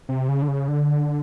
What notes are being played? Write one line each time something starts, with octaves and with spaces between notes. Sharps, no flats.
C3
C#3
D3
C#3
D3